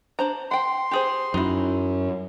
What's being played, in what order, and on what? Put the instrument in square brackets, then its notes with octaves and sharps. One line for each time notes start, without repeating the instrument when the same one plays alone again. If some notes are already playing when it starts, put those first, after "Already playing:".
[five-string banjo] D4 C5 A#5
[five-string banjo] F#5 G5 [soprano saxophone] C6
[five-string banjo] G4 G#4 C5
[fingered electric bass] F#2 [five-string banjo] D#4 E4